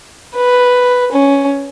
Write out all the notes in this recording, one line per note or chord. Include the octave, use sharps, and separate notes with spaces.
B4
C#4